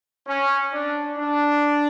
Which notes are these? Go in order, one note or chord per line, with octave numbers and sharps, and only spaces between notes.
C#4
D4
D4